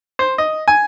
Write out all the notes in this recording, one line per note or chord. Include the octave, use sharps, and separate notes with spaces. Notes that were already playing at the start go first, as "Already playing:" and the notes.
C5
D#5
G#5